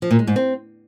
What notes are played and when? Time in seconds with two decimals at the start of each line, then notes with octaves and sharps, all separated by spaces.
0.02 F3
0.11 A#2
0.19 G#3
0.27 G#2
0.36 C4